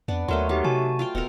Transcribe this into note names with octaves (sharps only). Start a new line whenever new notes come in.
F2 B3 D4 D5
D#2 F#3 A3 A#4 D#5 C6
F#3 D#4 G4 E5
C3 F#4 G#5 A5
F4 F5 G5
D1 B2 A4 A#4